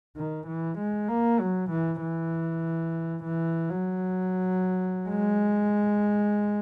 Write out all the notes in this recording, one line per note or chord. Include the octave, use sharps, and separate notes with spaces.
D#3
E3
G#3
A#3
F#3
E3
E3
E3
F#3
G#3